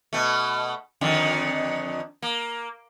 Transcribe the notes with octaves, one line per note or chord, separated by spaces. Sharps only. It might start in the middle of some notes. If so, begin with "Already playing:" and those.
B2 A3
F2 D3 D#3
A#3